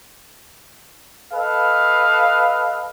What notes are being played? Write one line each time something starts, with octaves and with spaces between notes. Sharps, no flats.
A4 B4 D#5 F5